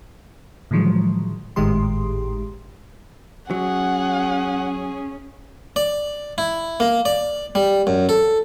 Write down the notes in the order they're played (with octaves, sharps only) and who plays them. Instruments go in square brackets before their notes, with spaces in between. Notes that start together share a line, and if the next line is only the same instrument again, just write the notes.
[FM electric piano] A2 D3 D#3 F3 F#3 G#3
G#1 A2 D#3 G#3 G4 C6
[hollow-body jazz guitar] F#3 [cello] C#4 [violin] G#4 [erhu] F#5
[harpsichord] D5
E4
A#3
D5
G3
F#2
A4